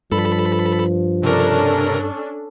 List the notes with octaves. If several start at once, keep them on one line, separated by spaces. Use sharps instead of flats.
G2 F3 A4 B5
C3 C#4 D4 A4 A#4